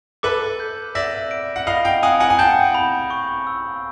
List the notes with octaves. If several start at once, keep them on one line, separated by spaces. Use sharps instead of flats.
A4 B4 D6
G6
D5 E5 A#6
D7
F#5
D#5 F5 B5
F5 G5
F#5 G#5 D#6
F#5 G#5
G#5
G5 A5 G6
B5
C#6
E6